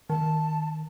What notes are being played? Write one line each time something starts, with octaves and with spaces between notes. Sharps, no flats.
D#3 A5